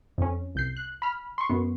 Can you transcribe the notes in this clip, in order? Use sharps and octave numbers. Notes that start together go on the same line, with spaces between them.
F2 C#4
C2 G6 C7
F#6
B5 F6
C6 C#6
F#2 B3